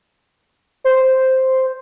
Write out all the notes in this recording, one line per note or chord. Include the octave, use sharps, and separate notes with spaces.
C5